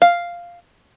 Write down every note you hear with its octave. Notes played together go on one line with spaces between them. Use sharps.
F5